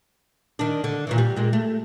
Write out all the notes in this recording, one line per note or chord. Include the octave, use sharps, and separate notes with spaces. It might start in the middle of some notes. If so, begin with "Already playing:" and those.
D#3 D4
D3
A#2 D#3 E3
G3
A#2 G#3
A3